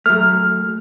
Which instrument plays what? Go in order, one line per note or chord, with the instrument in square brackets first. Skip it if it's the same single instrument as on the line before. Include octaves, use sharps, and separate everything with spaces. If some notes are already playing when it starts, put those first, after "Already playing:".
[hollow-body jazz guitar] F#3 A3 [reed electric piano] F6